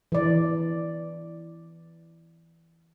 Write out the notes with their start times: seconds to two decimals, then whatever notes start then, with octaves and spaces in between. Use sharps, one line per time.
0.12 E3 D5